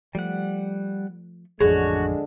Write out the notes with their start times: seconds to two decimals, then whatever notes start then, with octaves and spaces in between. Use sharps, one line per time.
0.15 F3 G3 A3 F#5
1.61 A1 F2 D3 G#3 D4 F#4 G#4 C#5